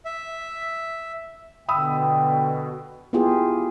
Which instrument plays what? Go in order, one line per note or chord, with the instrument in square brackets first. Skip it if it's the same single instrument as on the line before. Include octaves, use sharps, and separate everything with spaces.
[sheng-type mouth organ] E5
[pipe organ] B2 [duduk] D3 [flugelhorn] G5 [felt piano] B5 D#6 E6
[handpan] B3 E4 F4 G4 G#4